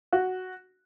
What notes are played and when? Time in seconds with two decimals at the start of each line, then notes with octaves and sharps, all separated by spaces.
0.12 F#4